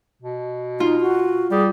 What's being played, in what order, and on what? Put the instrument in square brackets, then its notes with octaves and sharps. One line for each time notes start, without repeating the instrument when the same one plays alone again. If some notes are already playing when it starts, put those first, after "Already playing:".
[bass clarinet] B2
[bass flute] D#4 [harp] F4
[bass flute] F#4
[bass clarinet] G3 [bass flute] G#4